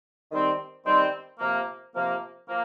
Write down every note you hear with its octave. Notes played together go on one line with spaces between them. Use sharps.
D#3 G3 C4
D#3 G3 C4
C3 F3 A#3
C3 F3 A#3
F3 A#3